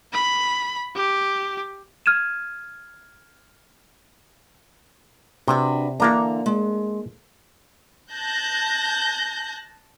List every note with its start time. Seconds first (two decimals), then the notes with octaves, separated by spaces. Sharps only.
0.13 B5
0.96 G4
2.06 F6 G#6 D#7 E7
5.48 C3 D4 F#4 B4
6.00 D3 E3 A#3 D4 A#5
6.46 G#3
8.12 A5 F#6 G6 A#6